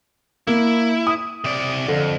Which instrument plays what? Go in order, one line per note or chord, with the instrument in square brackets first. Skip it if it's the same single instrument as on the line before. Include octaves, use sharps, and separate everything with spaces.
[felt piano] A#3 [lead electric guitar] E4
[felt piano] D#6
[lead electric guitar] C3 D5
[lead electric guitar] F2 [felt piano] D3